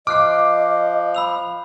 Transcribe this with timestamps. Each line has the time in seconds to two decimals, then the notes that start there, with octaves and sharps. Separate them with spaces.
0.07 F3 D#5 D6 F6 F#6 C7
1.15 B5 E6 F7